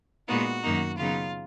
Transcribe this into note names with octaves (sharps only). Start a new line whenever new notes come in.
A#2 G#3 B3 D#4 F#4
F#2 D#3 A#3 D#4
C#3 F#3 B3 D#4 F4